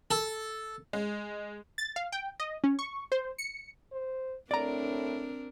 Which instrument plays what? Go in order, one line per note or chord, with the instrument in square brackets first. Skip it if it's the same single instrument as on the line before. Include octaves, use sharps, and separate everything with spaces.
[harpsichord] A4
[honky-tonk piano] G#3
[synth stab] A6
F5
G5
D#5
C#4
C#6
C5
C#7
[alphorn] C5
[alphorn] A2 [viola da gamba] C4 D4 A#4 [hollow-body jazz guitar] D5 A#5